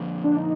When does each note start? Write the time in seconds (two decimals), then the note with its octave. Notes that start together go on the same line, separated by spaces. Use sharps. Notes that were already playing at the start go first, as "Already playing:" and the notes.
Already playing: D3 F3 A#3
0.24 D4
0.37 D#4